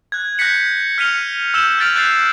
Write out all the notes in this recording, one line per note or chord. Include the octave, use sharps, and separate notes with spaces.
F#6 G#6
F#6 G6 A#6 B6 C#7 F#7
F6 B6 C#7 D#7 F7 G7
E6 G6 E7 G7
F6 G6 A6 B6 D7 F7
F#6 G6 A6 C7 F7 F#7